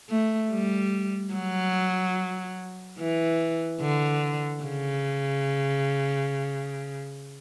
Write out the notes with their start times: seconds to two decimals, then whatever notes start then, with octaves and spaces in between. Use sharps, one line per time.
0.10 A3
0.51 G3
1.33 F#3
2.99 E3
3.81 D3
4.64 C#3